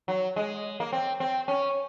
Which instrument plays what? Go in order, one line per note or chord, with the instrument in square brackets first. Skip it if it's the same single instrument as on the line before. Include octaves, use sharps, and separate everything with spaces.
[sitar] F#3
G#3
A#3
C4
C4
C#4